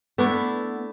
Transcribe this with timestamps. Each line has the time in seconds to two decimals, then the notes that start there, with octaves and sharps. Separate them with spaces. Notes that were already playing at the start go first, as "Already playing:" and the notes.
0.18 A3 B3 D4 E4